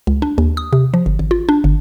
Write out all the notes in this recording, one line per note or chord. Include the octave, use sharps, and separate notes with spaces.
C#2
D4
D#2
D#6
C3
F3
G1
G#1
F4
D4
G1